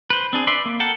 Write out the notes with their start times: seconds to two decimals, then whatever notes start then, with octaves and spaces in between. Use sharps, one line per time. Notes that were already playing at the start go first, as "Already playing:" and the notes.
0.10 B4 C5
0.33 C4 D4 G#4
0.47 B4 D5 E5 C6
0.65 A#3
0.80 A4 A#4 F#5 G5 A5